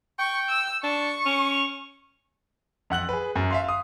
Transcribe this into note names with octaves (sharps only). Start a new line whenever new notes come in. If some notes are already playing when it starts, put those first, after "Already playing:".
G5 C#6
E6
D4 C#6
C#4
F2 F#5 F#6 F#7
G#4 B4
F#2
E5 F5 C6
F5 D#6